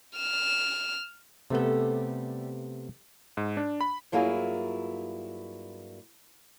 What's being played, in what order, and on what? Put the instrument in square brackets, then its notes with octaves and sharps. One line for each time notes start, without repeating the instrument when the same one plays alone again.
[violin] F6 E7
[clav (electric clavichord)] C3 A3 B3 [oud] G3 A4
[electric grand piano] G#2
D4
B5
[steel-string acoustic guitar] G2 F#3 A#3 E4 F4 G#4